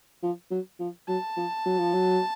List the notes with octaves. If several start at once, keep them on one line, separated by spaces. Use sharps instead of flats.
F3
F#3
F3
F#3 A5
F3
F#3
F3
F#3